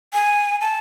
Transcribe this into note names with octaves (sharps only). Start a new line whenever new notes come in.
G#5
A5